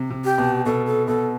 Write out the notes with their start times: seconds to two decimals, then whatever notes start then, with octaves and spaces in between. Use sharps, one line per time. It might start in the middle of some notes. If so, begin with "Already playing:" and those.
Already playing: C3
0.10 C3
0.24 G4
0.38 B2
0.65 B2 A4
0.86 A4
1.07 B2 A4